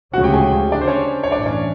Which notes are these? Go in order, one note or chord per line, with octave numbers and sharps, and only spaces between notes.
D2 C#3 F3 G#3 C#4 F#4 F#5
G4 G5
G#4 G#5
D4 D5
C5
C#4 C#5
C#5
A1 G2 E3 D4 D5
C#4 C#5